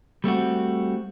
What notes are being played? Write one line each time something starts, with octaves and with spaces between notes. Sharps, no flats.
G3 A3 C4 F#4